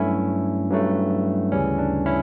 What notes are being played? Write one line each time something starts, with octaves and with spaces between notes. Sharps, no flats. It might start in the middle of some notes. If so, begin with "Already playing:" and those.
Already playing: G2 F#3 A3 C#4 E4
G2 F#3 A3
D2 C#3 E3 G3 C#4
D4
C#4 E4